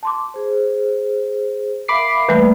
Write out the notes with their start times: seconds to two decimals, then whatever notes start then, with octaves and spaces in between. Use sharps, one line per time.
0.03 A5 C6 D6
0.34 G#4 C5
1.88 A#4 E5 F5 B5 D6 C7
2.29 E3 G3 A3 A#3 B4 D5